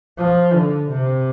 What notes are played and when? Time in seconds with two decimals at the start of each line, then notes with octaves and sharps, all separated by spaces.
0.18 F3
0.54 D3
0.90 C3